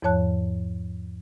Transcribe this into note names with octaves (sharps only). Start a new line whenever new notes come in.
E2 G#2 F3 C#5 A5 F#6